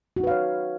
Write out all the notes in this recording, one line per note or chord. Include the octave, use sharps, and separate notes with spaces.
D#4 F#4 B4 C#5 F5